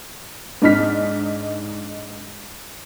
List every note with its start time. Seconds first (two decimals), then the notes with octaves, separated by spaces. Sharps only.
0.62 G#2 D4 D#4 F6 B6